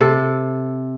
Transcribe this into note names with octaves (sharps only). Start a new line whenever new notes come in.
C3 A4